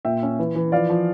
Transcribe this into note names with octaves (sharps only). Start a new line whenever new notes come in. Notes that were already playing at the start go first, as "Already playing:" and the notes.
A#2 E5 G5
C#4
E3
E3
F3 D5 F5
F3